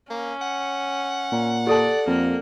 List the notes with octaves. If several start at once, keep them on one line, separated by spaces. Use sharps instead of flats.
A#3 C#4
F#5
A#2
G4 A4 D5 A5
F2 A#3